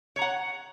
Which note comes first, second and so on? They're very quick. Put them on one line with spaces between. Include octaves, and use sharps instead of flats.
C#5 A#5 F#5